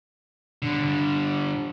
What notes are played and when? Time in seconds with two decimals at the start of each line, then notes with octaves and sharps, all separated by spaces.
0.62 D3 G3